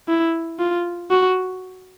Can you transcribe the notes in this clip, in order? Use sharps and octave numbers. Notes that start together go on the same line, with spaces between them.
E4
F4
F#4